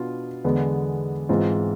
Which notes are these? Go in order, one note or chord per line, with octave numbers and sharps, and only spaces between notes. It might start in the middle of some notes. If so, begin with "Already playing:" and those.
Already playing: B2 B3 D4 F4
E2 D3 G#3 B3
G#2 E3 G#3 C4 F4